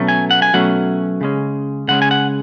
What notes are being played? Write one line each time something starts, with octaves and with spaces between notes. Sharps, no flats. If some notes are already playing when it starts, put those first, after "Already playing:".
Already playing: B2 F#3 A3 C#4
G#5
F#5
G#5
B2 F#3 A3 C#4 F#5
C#3 G#3 C#4
C#3 G#3 C#4 F#5
G#5
F#5